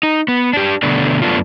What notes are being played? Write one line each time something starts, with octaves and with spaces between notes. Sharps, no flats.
D#4
B3
D4 G4
B2 D3 A3 B3 D4 D5
F#2 A3 B3 D4 F4